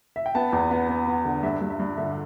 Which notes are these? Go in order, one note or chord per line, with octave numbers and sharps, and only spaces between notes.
E5
G5
B3 A5
E2
B3
B3
B3
D3
G2 E5
G2
E5
G2
D3 E5